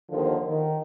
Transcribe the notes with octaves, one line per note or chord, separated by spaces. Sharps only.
D#2 D3 D#3 F3
D#3